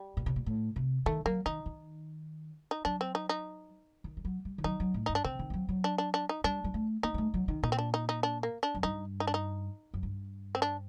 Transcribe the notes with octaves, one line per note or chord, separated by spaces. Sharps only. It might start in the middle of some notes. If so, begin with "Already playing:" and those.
Already playing: G3
A#2
C3
A#2
A2
C3
D#3 A3
F#3 A#3
D#3 D#4
D#3
D#4
F#3 D4
C4
D#4
D#4
D#3
G3
F#3
G3
D#3
F#3 D#4
F#3
A2
G2 D#4
D4
D3 C4
D#3
G3
F#3
F#3
D4
D4
D4
D#4
G3 D4
G3
A3
A#3 D#4
G3
A3
F#3
D#3
A#2 D#4
C4
D4
D#4
D#4
D4
A#3
D4
F#2
G2 D#4
D#4
D4
D#4
F#2
G2
C4
D4